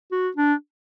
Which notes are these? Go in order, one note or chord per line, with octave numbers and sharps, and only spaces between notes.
F#4
D4